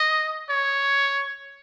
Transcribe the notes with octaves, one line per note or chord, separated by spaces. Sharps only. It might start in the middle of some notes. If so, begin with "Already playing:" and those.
Already playing: D#5
C#5